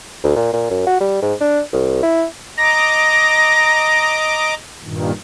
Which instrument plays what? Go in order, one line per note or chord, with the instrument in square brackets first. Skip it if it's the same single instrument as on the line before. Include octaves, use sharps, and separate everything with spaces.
[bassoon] D2
A#2
A#2
F#2
F#4
G3
G#2
D4
C2
E4
[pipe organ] D#5 A#5 D6 [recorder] A#6
[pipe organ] G2 A#2 D#3